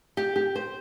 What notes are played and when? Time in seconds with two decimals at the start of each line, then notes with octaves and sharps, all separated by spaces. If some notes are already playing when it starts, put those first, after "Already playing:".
0.17 G4
0.36 G4
0.56 C5